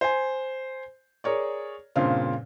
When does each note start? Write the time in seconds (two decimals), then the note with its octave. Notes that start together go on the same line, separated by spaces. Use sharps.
0.01 C5 G#5
1.24 G#4 A#4 C#5 D5
1.96 G2 A#2 C#3 C4 F5